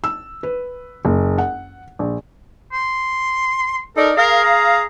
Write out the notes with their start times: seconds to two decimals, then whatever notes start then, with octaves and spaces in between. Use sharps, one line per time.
0.04 E6
0.43 B4
1.05 F#1
1.38 F#5
1.99 A#1
2.73 C6
3.97 D#4 A4 A#4 D5
4.17 G#4 A#4 F5
4.44 A#5